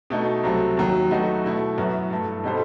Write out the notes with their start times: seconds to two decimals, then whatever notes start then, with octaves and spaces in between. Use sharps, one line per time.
0.10 B2 A3 D#4
0.44 C2 C3 F#3 A3
0.77 D#2 D#3 F#3
1.11 F#3 A3 D#4 F#4 B4
1.44 B2 A3 E4
1.77 F#2 E3 B3 F#4
2.10 G2 E3 A3
2.44 B2 G3 D#4 A4 C5